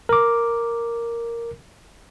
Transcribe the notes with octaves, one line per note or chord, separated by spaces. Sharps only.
A#4 D6